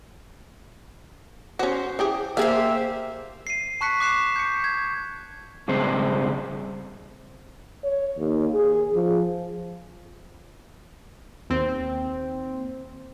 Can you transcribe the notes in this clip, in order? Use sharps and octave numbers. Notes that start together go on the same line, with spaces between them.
C#4 F#4 C5
E3 G4 G#4
A#3 G4 G#4 C5 E5 F5
C7 D#7
A5 C#6 F#6 B6 C#7
D6 F#6 C7 E7
G6 C#7
G#6
G#2 C#3 G3 C4 G#4 C5
C#5
D#2
G#4
F3
D#2 C4